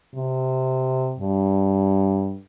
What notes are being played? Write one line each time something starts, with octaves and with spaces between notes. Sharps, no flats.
C3
G2